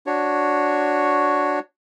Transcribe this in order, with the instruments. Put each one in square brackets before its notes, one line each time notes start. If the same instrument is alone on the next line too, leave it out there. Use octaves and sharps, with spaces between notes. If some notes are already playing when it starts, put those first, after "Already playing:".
[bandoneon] D4 F#4 C#5